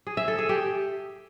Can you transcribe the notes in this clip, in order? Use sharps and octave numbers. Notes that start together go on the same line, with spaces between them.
G#4
E5
A4
G#4
G4